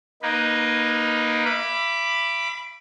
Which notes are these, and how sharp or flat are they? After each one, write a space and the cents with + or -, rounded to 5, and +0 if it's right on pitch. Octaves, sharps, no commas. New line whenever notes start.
A#3 +20 D#4 +0 B4 +0
E5 +40 B5 +0 D6 +0